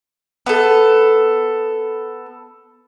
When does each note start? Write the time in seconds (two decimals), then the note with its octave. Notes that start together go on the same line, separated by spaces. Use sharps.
0.46 B3 A4